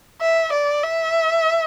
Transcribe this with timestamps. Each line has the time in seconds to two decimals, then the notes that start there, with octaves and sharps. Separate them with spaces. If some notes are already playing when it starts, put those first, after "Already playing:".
0.21 E5
0.53 D5
0.83 E5